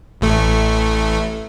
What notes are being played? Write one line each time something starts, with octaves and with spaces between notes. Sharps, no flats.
A1 A3